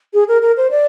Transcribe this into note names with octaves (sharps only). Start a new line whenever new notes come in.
G#4
A#4
A#4
C5
D5